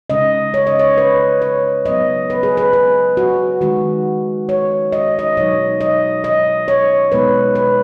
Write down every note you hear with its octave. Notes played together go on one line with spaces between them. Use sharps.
C#3 G#3 C#4 D#5
C#5
D#5
C#5
B4
C#5
C#3 F#3 B3 D#5
B4
G#4
B4
B4
F#4
D#3 G#3 D#4 F#4
C#5
D#5
D#5
B2 F#3 D#4 C#5
D#5
D#5
C#5
B2 G#3 B3 D#4 B4
B4